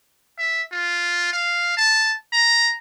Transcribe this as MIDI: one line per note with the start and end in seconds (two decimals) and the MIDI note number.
0.38 0.62 76
0.72 1.31 65
1.33 1.74 77
1.77 2.15 81
2.33 2.73 82